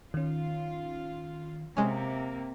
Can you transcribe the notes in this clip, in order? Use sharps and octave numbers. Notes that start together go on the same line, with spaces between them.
D#3 C#4 F4
C3 G#3 A#3 C#4